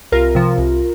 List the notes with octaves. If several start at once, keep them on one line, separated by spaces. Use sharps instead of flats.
C2 F4 A#4
C3 F3
C2